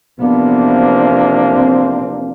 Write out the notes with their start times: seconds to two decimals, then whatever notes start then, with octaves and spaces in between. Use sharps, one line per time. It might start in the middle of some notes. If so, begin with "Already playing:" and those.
0.19 E2 C3 F3 A#3 B3 D4
1.54 C4